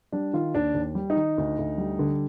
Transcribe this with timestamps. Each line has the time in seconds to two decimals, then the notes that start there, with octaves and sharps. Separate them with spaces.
0.12 G3 D4
0.33 D#3 F4
0.55 D#2 D4
0.74 D#2
0.95 G3
1.10 D#4
1.16 D#3
1.38 D2
1.59 D2
1.78 G3
1.99 D3